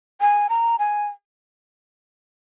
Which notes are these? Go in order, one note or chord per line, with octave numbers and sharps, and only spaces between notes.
G#5
A#5
G#5